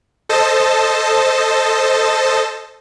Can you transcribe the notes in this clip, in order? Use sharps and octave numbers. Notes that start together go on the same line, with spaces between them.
A4 C5 D#5 A5